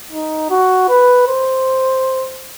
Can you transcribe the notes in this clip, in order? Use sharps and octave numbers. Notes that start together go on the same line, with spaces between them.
D#4
F#4
B4
C5